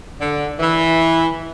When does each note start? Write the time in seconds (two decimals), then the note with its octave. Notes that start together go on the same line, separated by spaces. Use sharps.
0.20 D3
0.60 E3